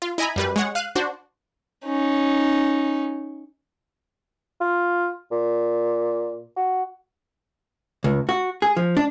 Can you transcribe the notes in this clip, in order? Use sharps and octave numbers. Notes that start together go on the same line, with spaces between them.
F4
E4 D#5 G#5 A#5 B5
F#2 G3 B4
G#3 C#5 F#5
F5 F#6 D#7
D4 F#4 C5
C#4 D#4
F4
A#2
F#4
C#2
F#4
G#4
F3
D4